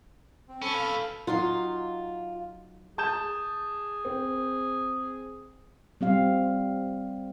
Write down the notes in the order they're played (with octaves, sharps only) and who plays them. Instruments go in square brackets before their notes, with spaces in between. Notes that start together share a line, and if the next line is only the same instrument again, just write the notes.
[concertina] C4
[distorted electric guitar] C#4 [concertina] A4 B5
[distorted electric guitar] B2 F5
[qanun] F#3 D#4 C6 [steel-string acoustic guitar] F4
[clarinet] G#4 [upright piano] A5 G6 E7
[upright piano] C4
[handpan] G3 C4 F5